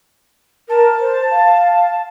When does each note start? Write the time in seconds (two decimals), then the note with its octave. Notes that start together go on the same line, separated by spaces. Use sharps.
0.69 A#4 A5
1.01 C5
1.31 F5